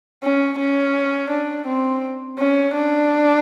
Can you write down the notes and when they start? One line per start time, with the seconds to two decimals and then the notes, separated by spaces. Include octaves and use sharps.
0.24 C#4
0.59 C#4
1.31 D4
1.67 C4
2.39 C#4
2.74 D4